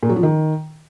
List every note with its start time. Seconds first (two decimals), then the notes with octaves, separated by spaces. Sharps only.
0.03 A#2
0.09 F#3
0.16 F3
0.23 D#3